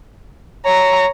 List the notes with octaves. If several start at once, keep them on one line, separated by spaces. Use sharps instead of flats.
C#5 A#5